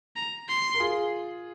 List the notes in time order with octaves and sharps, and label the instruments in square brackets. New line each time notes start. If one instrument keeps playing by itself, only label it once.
[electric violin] A#5
C6
[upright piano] A#4
F4 G#4